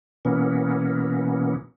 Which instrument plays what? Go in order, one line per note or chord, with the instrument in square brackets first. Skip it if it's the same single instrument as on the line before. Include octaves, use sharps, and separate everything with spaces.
[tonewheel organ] B2 E3 A#3 B3 C#4